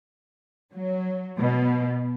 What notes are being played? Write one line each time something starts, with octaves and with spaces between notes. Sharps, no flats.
F#3
B2